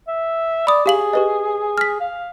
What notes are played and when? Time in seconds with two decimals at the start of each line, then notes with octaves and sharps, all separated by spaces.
0.08 E5
0.67 D5 B5 D#6
0.86 G4 G#4 F5 F#7
1.13 G4 B4 D#5
1.78 F6 B6
2.00 F5